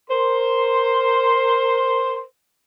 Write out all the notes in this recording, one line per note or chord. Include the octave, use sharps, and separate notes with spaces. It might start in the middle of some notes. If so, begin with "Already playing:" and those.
A#4 C5 C6